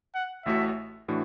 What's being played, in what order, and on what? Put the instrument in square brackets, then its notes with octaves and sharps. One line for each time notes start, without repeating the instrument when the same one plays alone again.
[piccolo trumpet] F#5
[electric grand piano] A1 A2 A3 F#4 [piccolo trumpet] E5
[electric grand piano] A2 E3 D4 F#4